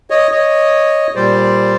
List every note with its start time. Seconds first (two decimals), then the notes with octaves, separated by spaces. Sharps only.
0.10 C#5 D#5
0.31 C#5 D#5
1.15 A#2 G3 C5 D5